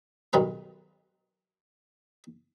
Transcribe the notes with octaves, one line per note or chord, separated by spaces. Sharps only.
B1 G2 D#3 B4 A#5